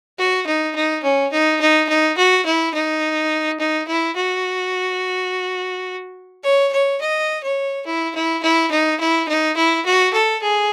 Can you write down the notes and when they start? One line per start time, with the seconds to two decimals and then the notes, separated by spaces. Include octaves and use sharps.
0.18 F#4
0.46 D#4
0.75 D#4
1.03 C#4
1.32 D#4
1.60 D#4
1.88 D#4
2.17 F#4
2.45 E4
2.74 D#4
3.59 D#4
3.88 E4
4.16 F#4
6.43 C#5
6.72 C#5
7.01 D#5
7.43 C#5
7.86 E4
8.15 E4
8.43 E4
8.71 D#4
9.00 E4
9.28 D#4
9.56 E4
9.85 F#4
10.13 A4
10.42 G#4